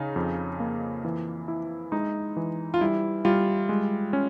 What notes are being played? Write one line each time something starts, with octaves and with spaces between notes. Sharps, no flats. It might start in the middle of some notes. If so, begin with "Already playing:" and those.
Already playing: C#3 D#4
F2
A#3
E3
E4
G#3 D#4
E3
F4
G3 E4
G3 F4
G#3
C#4